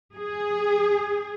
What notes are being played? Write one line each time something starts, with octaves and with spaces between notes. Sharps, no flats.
G#4